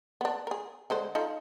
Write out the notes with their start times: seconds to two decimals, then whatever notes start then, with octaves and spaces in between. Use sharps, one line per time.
0.21 B3 D4
0.47 G#4 A#4
0.90 D3 G#3 C5
1.15 D#4 F4 A4